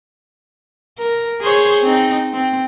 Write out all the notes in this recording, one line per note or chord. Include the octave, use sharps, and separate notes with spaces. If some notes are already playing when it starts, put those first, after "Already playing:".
A#4
G#4 C5 C#5
C4 D#4
C4